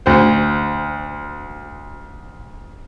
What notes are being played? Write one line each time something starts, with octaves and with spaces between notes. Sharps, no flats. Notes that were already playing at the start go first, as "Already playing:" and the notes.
D2 C5